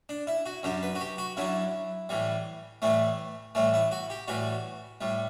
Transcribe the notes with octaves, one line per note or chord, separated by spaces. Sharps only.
D4
E4
F#4
F#2 D3 F#3 G4
B4
F#4
G4
F#4
F#2 D3 F#3 E4
A2 E3 G3
A2 E3 G3 A3
A2 E3 G3 A3
E4
F#4
G4
A2 E3 G3 F#4
A2 G3